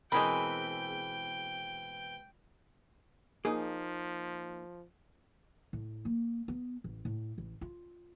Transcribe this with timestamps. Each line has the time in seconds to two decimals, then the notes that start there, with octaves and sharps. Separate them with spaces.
0.12 B2 E3 G#3 C4 G#4 A#4 G5 B5
3.45 F3 A#3 D#4 G#4
5.73 A2
6.05 A#3
6.48 B3
6.84 A1
7.05 A2
7.38 A1
7.61 F4